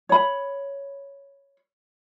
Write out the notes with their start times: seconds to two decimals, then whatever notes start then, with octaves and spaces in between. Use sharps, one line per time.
0.09 C#5 B5